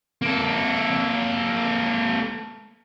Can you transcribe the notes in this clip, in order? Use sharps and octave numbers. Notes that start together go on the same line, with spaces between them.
A#3 A4